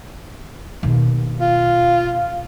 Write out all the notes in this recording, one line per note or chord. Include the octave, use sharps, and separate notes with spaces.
D#2 B2
F4